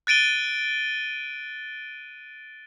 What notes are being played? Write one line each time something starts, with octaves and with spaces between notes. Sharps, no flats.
F#6 A6 D7 D#7 G7